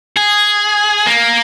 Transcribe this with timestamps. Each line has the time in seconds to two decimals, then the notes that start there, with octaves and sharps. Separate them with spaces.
0.17 G#4
1.07 A#3